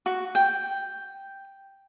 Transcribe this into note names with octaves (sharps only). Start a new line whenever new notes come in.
F#4
G5